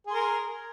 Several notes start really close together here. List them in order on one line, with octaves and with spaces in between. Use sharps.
G#4 C6 A#4